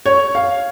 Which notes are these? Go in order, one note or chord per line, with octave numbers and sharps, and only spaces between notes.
C#5
F5